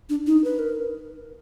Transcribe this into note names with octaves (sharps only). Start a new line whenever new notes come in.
D4
D#4
B4
A#4